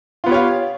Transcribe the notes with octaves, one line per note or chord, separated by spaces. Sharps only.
B3 F4 G4 C#5 F5